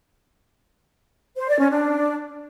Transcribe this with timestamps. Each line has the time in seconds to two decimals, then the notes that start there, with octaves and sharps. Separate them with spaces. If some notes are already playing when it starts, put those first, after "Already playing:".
1.37 C5
1.48 D5
1.59 C#4
1.70 D4